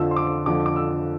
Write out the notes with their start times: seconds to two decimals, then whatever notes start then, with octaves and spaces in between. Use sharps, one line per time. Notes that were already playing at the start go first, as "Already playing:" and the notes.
Already playing: F2 D3 F3 E6
0.11 C6
0.16 D6
0.46 F2 D3 F3 D6
0.66 D6
0.76 E6